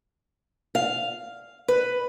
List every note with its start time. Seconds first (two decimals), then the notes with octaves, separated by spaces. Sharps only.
0.75 F5
1.68 B4